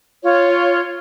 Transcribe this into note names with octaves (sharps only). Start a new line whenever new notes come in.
F4 C#5